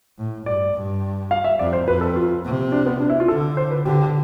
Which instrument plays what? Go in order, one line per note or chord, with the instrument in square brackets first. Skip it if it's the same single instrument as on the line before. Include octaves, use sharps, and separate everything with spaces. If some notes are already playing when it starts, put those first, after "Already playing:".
[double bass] A2
[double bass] G2 [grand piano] D5
[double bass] G2
[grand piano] F5
E5
[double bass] F2 [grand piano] D5
[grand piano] C5
[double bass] F2 [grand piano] B4
[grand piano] A4
F4
[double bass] C3
[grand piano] D4
B3
D4
E4
F4
[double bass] D3 [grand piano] A4
[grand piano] C5
B4
[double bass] D3 [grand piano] G4